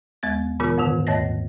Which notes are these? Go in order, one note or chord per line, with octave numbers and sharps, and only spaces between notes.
D#2 G#3 B3 A6
A#2 C#3 E3 B3 F4 A#4
F2 G#2 D3 D#3
D#2 G#2 A3 C#5 D#5 A#6